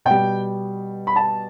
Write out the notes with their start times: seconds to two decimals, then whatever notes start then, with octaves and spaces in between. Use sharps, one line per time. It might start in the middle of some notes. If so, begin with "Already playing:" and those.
0.05 B2 G3 G5
1.07 B5
1.16 A5